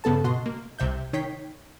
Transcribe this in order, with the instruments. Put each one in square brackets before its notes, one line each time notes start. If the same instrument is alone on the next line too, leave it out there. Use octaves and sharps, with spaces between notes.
[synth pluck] G2 C#3 B3 A4 A5
B2 F#4 D#5 C6
A#3
C2 C3 E5 G6
D#3 D#4 C#5 G5 B6 C7